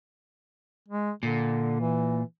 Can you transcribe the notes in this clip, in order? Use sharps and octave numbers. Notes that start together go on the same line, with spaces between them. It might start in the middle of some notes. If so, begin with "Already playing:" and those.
G#3
A#2 D3
E3